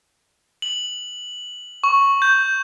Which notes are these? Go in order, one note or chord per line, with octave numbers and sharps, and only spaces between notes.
F#7
C#6
G6